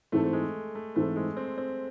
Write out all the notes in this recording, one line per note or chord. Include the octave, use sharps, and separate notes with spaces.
G#2 E3 A3 C4 E4 A4
A3
G#3
A3
G#2 E3 A3 C4 E4 A4
G#3
C4
C4